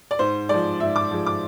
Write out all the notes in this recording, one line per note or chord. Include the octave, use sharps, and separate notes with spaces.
D5
G#2 C5
F3 G#3 D5
G#2 E5
D6
F3 G#3
D6